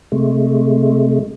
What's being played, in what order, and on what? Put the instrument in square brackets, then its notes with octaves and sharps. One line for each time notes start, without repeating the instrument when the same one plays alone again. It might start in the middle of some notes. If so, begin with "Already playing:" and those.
[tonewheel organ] C3 G#3 A3